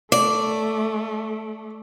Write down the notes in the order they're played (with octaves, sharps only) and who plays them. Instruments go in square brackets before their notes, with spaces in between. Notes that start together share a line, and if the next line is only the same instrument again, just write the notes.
[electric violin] A3 [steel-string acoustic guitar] D5